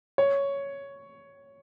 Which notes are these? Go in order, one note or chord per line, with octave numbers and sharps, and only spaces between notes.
C#5